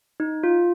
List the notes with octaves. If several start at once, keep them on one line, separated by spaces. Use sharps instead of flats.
D#4
F4